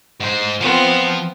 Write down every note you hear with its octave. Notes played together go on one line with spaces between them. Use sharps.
G#2 C5
F3 B3 C4